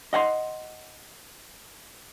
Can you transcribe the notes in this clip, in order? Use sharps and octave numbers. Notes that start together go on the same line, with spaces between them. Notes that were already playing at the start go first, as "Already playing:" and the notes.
D#5 F#5 G5 C6